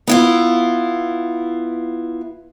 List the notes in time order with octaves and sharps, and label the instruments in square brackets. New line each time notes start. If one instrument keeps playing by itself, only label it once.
[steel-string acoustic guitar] B3 E4 F4